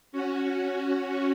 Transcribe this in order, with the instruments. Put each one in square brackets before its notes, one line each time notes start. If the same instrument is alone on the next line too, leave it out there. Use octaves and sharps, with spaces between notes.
[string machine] C#4 F#4